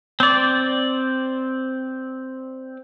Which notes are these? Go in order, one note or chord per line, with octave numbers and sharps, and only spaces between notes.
C4 D5